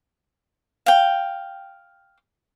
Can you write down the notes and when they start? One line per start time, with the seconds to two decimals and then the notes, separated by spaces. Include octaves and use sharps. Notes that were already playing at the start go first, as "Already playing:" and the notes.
0.86 F5 G5